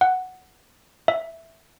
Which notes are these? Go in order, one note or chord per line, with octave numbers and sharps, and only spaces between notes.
F#5
E5